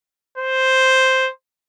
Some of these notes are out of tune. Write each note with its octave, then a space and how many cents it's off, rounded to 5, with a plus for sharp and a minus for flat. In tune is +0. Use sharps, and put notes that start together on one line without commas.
C5 +0